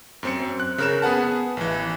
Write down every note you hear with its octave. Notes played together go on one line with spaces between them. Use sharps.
F#2 C4 C#7
F#6
C#3 A#4 E7
B3 G#4 B4 F#5 A5
A1 E3